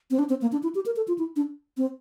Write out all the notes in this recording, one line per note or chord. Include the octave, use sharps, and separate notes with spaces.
C4
D4
C4
A#3
D4
E4
G4
A#4
A4
F4
E4
D4
C4